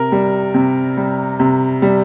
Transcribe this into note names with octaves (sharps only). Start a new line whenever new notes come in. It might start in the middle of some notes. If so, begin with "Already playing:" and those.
Already playing: C3 A#4
G3
C3
G3
C3
G3